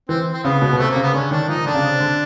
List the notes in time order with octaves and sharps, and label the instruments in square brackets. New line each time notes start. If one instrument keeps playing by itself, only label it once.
[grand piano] E3 [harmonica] C4
[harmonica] C4
[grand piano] C#3 [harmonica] B3
[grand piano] B2
B2
[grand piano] C3 [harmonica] A3
[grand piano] C#3 [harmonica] A#3
[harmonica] B3
[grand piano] D3 [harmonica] C#4
[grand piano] D#3 [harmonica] D4
[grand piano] F3 [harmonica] D#4
[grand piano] D#3
[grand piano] D3 [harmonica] D4
[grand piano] C#3
C3
D3